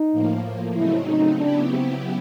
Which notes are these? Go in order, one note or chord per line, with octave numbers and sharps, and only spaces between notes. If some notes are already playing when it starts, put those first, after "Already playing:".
Already playing: D#4
A2 F3 A#3
C#3 F#3 A3 C4 D#4 E4
D#4
C#3 F#3 B3 D4 E4 G4
C4